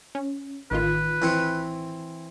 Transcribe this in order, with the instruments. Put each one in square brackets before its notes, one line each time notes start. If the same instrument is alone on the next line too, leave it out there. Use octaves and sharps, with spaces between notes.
[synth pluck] C#4
[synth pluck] A1 D#3 F4 [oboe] B4
[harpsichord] E3 C4 C#6